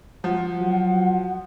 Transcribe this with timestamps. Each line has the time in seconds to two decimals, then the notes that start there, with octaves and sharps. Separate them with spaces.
0.24 F3 F#5
0.60 F#3